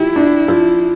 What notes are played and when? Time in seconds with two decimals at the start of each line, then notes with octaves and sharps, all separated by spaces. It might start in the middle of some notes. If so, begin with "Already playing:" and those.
Already playing: F3 E4 G4
0.16 D4
0.48 F3